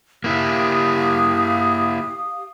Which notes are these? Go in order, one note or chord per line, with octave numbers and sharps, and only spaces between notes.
A#3 E4 G4 F5 D#6